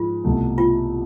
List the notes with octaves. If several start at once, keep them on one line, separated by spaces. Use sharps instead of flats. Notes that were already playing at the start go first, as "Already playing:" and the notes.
Already playing: G#2 F3 G#3 F4
C2 B2 A3
F4